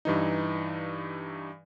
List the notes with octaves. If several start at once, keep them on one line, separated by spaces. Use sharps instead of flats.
G2 E3 D#4